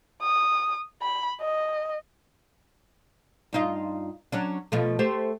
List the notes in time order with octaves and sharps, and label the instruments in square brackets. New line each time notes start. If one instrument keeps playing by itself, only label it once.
[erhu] D#6
B5
D#5
[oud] G2 D#4 F4
F#3 C#4 D4
B2 F3 A3
A3 G4 C5